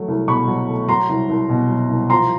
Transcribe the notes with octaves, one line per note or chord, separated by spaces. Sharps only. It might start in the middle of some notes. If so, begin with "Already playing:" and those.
Already playing: F#3 A3
C2
B2 B5 C#6
F#3
A3
F#3 A#5 C6
C2
C2
B2
F#3
C2
F3 A#5 C6